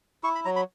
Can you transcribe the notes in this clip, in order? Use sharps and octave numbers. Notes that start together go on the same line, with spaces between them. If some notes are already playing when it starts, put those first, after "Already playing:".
E4 C#6
B5
F#3 A#5
B5